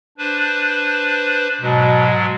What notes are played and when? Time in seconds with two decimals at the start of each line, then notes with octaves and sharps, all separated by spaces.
0.18 D4 B4 C5
1.61 G#2 B2 F#3 G#3